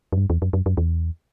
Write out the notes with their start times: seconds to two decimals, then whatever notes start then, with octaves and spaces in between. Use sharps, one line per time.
0.12 F#2
0.18 G2
0.30 E2
0.42 F#2
0.53 F#2
0.66 F#2
0.77 E2